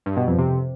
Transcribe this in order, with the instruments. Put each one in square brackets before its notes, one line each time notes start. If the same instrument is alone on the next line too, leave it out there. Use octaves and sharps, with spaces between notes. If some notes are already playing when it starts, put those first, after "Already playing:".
[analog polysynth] G2
B2
F2
C3